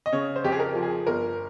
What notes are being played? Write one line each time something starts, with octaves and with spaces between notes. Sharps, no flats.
D#5
C#3 C#5
C5
F2 G4
G#4
A#4
F3
G#4
G1 A#4